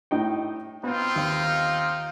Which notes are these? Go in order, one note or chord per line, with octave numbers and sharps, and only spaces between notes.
A2 D#4 G5
B3 C4 D#4 F4
D#2